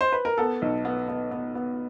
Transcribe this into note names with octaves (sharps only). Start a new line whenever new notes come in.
C5
B4
A#4
B3 A4
B1
B3
B3
B3
B3